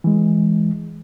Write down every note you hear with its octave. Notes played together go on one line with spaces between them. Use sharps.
E3 G#3